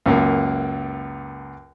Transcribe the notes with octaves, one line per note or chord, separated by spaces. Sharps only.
C#2 F#2 A#3